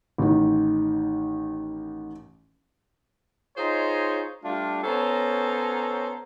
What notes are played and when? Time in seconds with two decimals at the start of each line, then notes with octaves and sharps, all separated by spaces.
0.18 A1 D#3
3.57 D#4 F4 G#4 C5 C#5 D#5
4.44 G3 A3 D4 F4
4.83 B3 C#4 A4 C5 C#5 A#5